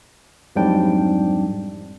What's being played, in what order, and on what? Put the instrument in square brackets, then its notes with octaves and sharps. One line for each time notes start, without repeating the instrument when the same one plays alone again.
[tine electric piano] F2 G#2 F#3 G3 D4 G5